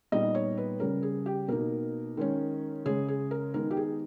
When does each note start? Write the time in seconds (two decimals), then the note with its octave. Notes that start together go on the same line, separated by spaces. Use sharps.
0.12 A#2 G3 B3 D#4 D#5
0.35 C#5
0.57 B4
0.80 C#3 G3 C#4 A#4
1.03 G#4
1.26 G4
1.48 B2 A#3 D#4 A#4
2.17 D#3 G#3 C#4
2.85 C#3 G#3 C#4 G#4
3.08 G#4
3.31 A#4
3.54 D#3 G#3 B3 D#4 A#4
3.71 G4
3.77 G#4